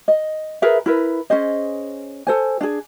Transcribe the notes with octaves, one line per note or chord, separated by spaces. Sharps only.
D#5
G#4 A#4 B4 E5
E4 A#4 B4
C#4 G#4 C5 D#5
A4 C5 G#5
D4 G#4